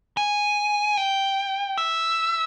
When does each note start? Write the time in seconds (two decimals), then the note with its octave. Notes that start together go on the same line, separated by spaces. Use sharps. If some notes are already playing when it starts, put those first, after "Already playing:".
0.17 G#5
0.97 G5
1.77 E5